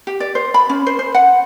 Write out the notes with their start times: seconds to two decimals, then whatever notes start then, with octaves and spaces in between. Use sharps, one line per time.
0.07 G4
0.20 D5
0.35 C5
0.54 B5
0.69 C#4
0.87 C5
0.99 C5
1.15 F#5